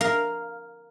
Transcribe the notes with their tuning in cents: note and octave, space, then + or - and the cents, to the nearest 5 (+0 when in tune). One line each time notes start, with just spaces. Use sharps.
A#4 +0 F5 +0